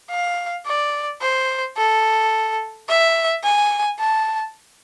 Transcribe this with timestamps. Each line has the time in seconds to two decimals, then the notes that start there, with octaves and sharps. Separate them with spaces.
0.10 F5
0.66 D5
1.22 C5
1.77 A4
2.89 E5
3.44 G#5
4.00 A5